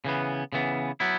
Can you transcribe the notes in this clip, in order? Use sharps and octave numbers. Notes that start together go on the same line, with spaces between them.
C#3 E3 B3
C#3 E3 B3
F#3 B3 E4